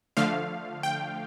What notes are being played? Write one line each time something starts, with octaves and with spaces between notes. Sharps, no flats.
D3 F3 A3 F5
G5